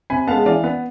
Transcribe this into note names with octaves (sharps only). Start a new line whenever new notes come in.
C3 G#5 B5
G#3 B3 F5 A5
E3 D5 F5
B3